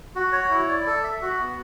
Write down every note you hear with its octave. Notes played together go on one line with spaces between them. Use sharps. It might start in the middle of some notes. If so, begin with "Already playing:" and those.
F#4
C#5
E4
D5
A4
E5
F#4
B3